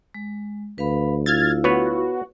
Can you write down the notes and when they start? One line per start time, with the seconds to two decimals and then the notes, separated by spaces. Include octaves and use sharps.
0.14 G#3
0.78 D2 B4 F5 B5
1.26 E4 F4 F5 F6 G#6 A6
1.64 B3 F#4 B4 C#5